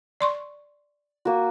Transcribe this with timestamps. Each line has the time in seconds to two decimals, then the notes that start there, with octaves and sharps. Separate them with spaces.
0.21 D5 C6 C#6
1.25 A#3 F#4